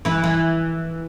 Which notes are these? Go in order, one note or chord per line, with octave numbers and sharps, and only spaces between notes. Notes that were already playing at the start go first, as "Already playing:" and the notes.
E3 E4
E3